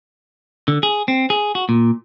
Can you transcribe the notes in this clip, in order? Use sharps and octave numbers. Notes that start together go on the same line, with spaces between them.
D3
G#4
C4
G#4
F#4
A#2